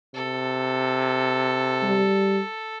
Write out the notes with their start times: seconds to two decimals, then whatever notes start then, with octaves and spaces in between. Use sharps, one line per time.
0.14 C3 A4
1.83 G3